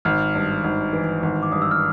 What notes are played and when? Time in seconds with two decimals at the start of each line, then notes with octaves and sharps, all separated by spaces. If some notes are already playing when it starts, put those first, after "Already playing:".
0.05 G#1 F6
0.35 G2
0.64 G#1
0.93 E3
1.23 G#1
1.43 D6
1.52 G2 D#6
1.62 E6
1.71 F6